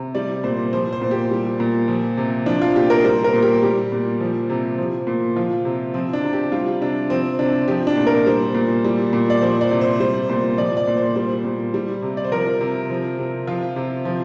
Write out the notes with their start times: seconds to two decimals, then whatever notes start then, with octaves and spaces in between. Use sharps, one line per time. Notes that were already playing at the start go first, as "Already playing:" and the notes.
Already playing: C3
0.15 G3 D5
0.44 A#2 C5
0.73 F3 C5
0.93 C5
1.01 A#2
1.11 G4
1.31 G3
1.60 A#2
1.88 F3
2.17 C3
2.46 F3 D4
2.62 F4
2.76 A#2 G4
2.90 A#4
3.04 G3 C5
3.24 A#4
3.33 A#2
3.43 G4
3.63 G3 G4
3.92 A#2
4.20 F3
4.49 C3
4.78 F3
5.07 A#2
5.36 F3 F4
5.65 C3
5.94 F3 C4
6.13 D4
6.24 C3
6.33 G4
6.52 G3 F4
6.81 C3 D4
7.10 F3 C4
7.39 C3 D4
7.68 F3 G4
7.87 D4
7.97 A#2
8.07 A#4
8.26 G3 C5
8.54 A#2
8.84 G3
9.13 A#2
9.30 D5
9.42 F3 C5
9.61 D5
9.71 C3
9.81 C5
10.00 G3 C5
10.29 A#2 C5
10.57 F3 D5
10.77 D5
10.88 A#2
10.97 C5
11.16 G3 C5
11.45 A#2
11.74 G3
12.02 C3
12.17 D5
12.24 C5
12.32 F3 A#4
12.61 C3
12.90 F3
13.19 C3
13.47 F3 F4
13.76 C3
14.05 F3